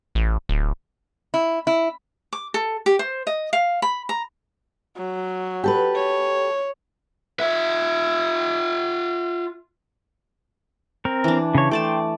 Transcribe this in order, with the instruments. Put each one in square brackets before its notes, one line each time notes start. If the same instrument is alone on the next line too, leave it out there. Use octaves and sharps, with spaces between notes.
[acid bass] A1
D1
[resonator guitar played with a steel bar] E4
E4
[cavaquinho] D6
A4
G4
C5
D#5
F5
B5
A#5
[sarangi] F#3
[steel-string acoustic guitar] G4 A4 B4
[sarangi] C#5
[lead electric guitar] F4 E5
[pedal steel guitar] C4 A#4
[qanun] E3 D4
[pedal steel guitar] C#3 C#5
[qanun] A3 D5 A5 [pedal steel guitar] G5 C6